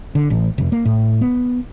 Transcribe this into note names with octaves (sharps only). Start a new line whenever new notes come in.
D3
A1
F1
A#3
A2
B3